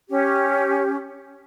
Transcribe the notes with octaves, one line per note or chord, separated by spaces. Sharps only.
C#4 G4